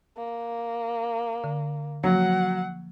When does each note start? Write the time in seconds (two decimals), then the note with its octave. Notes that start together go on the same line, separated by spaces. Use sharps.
0.17 A#3
1.44 D3
2.04 F3 F#3 A#3 F#5